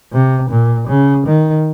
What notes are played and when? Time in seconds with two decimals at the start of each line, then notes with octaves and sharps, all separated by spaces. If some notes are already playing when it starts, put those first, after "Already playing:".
0.13 C3
0.50 A#2
0.88 C#3
1.26 D#3